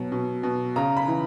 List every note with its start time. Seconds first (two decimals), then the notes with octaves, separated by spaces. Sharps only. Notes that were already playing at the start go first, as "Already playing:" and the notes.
Already playing: B2 F#3
0.12 B2
0.43 B2
0.76 C#3 A#5
0.97 B5
1.08 E3